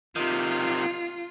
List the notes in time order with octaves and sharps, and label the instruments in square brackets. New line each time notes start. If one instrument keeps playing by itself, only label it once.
[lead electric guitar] C3 D#3 [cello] F4